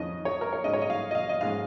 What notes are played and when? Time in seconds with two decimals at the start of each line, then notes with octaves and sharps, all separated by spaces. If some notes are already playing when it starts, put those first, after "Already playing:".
Already playing: F2 D#3 C#4 D#5
0.25 C#5
0.41 A#4
0.53 C#5
0.64 G#2 G#3 C#4 D#5
0.73 C#5
0.82 D#5
0.90 F5
1.11 D#5
1.15 F5
1.29 D#5
1.41 G#2 G#3 C#4 F5